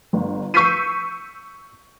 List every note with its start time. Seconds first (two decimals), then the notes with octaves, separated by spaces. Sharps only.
0.13 G1
0.54 C#6 E6 G6 B6 C7 D#7